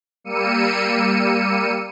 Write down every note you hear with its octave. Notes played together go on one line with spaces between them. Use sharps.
G3 A#3 E6 C#7 D#7